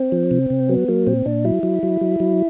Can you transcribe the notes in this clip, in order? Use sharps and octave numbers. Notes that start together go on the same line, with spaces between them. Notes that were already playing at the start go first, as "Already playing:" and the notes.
Already playing: C4
F3
C3
C3
F#3 B3
F#3 A#3
A#2 C4
A#2 D4
F#3 E4
F#3
F#3
F#3
F#3